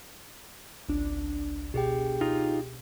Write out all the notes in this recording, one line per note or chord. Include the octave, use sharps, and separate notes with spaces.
G#1 C#2 D4
B2 G4 G#4 G5
D#4 F4